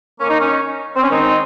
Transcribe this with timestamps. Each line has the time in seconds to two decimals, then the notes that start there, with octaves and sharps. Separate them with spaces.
0.21 D#3 A#3 C#4
0.30 D#4
0.40 C#4
0.96 C4
1.03 C#4
1.10 D#3 G#3 C4 D#4